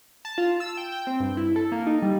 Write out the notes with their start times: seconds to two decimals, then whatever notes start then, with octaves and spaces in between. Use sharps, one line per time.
0.25 A5
0.38 F4
0.60 E6
0.77 G5
0.92 G5
1.07 C4
1.20 G2
1.37 E4
1.56 A4
1.72 A#3
1.87 D#4
2.02 G3